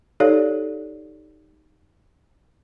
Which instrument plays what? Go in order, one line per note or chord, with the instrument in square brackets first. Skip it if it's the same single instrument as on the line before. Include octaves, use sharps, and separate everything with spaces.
[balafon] D#4 G4 A4 C#5 D5 F5